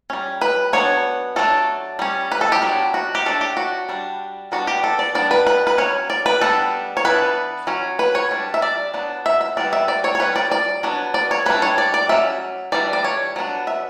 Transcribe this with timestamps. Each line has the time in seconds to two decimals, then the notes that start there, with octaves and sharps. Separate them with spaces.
0.10 G3 C#4
0.41 B4
0.73 F#3 B3 D4 C#5
1.36 F#3 A3 D4 A4
1.99 G3 C#4
2.32 B4
2.41 A4
2.52 G4
2.62 F#3 B3 D4
2.94 F#4
3.15 G4
3.26 F#3 A3 D4 A4
3.41 G4
3.57 F#4
3.89 G3 D4
4.52 G3 B3 D4 F#4
4.67 G4
4.84 A4
4.99 D5
5.15 G3 B3 D4 D5
5.31 B4
5.47 B4
5.67 B4
5.78 F#3 C#4 C#5
6.10 D5
6.26 B4
6.41 G3 B3 D4 A4
6.97 C#5
7.05 E3 B3 D4 B4
7.67 F#3 C#4
7.99 B4
8.15 C#5
8.31 G3 D4
8.54 E5
8.62 D5
8.94 F#3 B3 D4
9.26 E5
9.41 E5
9.57 E3 G3 B3 D4 D5
9.73 E5
9.88 D5
10.04 C#5
10.15 C#5
10.20 G3 C#4 B4
10.36 D5
10.51 D5
10.83 F#3 B3 D4
11.14 D5
11.31 C#5
11.46 E3 G3 D4 B4
11.62 C#5
11.78 D5
11.94 D5
12.09 F#3 C#4 E5
12.72 E3 G3 D4 D5
12.93 D5
13.04 C#5
13.36 F#3 B3 D4
13.67 E5